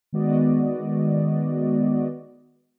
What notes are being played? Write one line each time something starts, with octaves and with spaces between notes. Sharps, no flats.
D#3 G#3 B3 F#4 D5 D#5